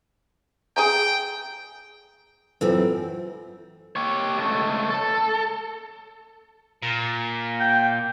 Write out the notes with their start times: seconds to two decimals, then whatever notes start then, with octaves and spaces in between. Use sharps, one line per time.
0.77 G#4 G5 G#5 A#5
2.61 F#2 E3 C4 F4 A4 B4
3.96 G4 C#5
4.38 C#2 A3
4.90 A4
6.82 A#2
7.60 G5